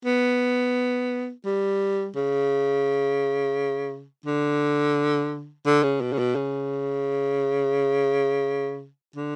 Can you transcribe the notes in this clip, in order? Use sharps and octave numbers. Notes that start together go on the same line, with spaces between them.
B3
G3
C#3
D3
D3
C#3
B2
C#3
B2
C#3
D3